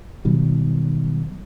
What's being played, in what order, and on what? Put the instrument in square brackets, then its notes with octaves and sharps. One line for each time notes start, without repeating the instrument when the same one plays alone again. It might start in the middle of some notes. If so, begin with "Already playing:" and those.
[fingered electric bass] B2 D#3 F#3 G3